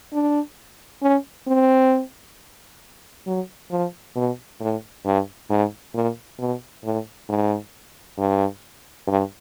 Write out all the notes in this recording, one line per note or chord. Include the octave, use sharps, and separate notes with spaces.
D4
C#4
C4
F#3
F3
B2
A2
G2
G#2
A#2
B2
A2
G#2
G2
G2